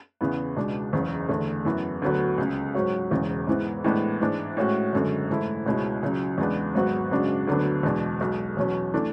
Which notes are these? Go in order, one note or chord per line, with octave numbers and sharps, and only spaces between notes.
E2 C#3 E3 B3
C#2 B2 G#3 D4
F#1 E2 C#3
E2 D3 A3
F#2 E3 B3
D2 D3 F#3 B3 F#4
C#2 C#3 G#3
G#2 F#3 C#4 F#4
E1 E2 C#3 E3 G#3
G#2 E3 B3
A2 E3 G#3 B3 D4
G#2 E3 G#3 D4
A2 G#3 C#4 F#4
F#1 F#2 D3 G#3
G#2 E3 A3 E4
C#2 B2 G#3 C#4 E4
C#2 C#3 F#3
E2 C#3 G#3 B3 D4
G#1 G#2 F#3 B3 F#4
F#2 C#3 G#3 D4 F#4
D2 D3 F#3 B3 D4
E2 B2 G#3 D4
B1 B2 G#3
E2 B2 F#3 C#4
E3 A3 D4